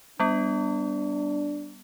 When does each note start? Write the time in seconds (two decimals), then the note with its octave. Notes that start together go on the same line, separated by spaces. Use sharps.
0.20 G3 B3 D4